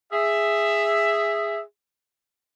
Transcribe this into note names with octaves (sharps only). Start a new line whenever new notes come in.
G#4 E5